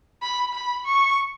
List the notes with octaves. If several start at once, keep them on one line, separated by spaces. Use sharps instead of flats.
B5
B5
C#6